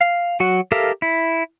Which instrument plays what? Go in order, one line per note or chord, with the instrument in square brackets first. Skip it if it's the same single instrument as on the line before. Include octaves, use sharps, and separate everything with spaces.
[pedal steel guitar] F5
F#3 F#4 F#5
G4 A4 A#4 E5 F5
E4